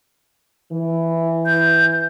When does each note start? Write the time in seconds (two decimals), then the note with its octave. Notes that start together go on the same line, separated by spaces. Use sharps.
0.72 E3
1.46 G6